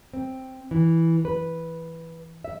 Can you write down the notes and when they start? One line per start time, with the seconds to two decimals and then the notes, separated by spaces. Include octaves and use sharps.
0.13 C4
0.71 E3
1.25 B4
2.44 E5